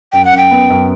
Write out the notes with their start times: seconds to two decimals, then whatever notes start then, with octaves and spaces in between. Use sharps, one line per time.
0.13 F#2 G5
0.25 F#5
0.32 F#2
0.37 G5
0.51 B3
0.70 F#2